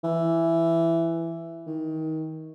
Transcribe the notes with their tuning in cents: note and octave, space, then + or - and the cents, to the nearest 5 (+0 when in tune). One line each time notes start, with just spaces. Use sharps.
E3 +10
D#3 +25